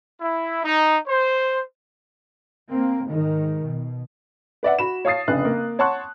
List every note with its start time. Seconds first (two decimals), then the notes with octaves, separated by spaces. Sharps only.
0.21 E4
0.64 D#4
1.08 C5
2.71 A#3 C4
3.07 G#2 D#3
3.64 B2
4.63 B4 D5 E5 F#5
4.79 F#4 B5 E7
5.05 C#5 F5 A5 D#6 A6 C7
5.28 F1 C#3 D4 B4 G#5 F#6
5.45 A#3
5.79 C#5 F#5 A5 C6 C#6 F#6